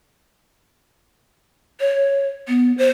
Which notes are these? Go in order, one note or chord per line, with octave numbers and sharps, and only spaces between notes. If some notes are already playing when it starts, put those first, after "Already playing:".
C#5
B3
C5